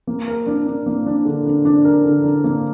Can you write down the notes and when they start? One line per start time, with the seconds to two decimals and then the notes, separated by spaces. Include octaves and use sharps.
0.07 A#3
0.27 A#4
0.46 D4
0.67 D4
0.86 A#3
1.06 D4
1.25 D3
1.45 D4
1.65 D4
1.85 A#4
2.04 D3
2.24 D4
2.44 A#3